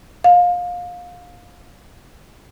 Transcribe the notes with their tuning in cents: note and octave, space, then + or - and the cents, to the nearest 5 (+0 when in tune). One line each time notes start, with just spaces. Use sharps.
F5 +25